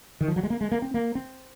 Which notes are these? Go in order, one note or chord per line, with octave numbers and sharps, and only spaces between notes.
D#3
F3
F#3
G#3
A#3
G#3
A#3
C4
A#3
C4